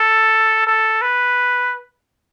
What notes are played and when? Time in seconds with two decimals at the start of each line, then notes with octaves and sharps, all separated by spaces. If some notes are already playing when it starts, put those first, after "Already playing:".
Already playing: A4
0.67 A4
1.02 B4